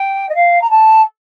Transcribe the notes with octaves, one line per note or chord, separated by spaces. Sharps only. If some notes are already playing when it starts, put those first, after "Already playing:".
Already playing: G5
D#5
F5
A#5
A5